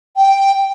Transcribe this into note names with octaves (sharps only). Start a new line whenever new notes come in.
G5